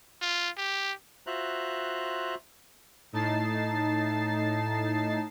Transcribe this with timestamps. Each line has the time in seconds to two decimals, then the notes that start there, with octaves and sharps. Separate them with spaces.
0.22 F4
0.57 G4
1.27 F4 F#4 C5 E5 A#5 F#6
3.13 A2 D#4 A5 A6 C7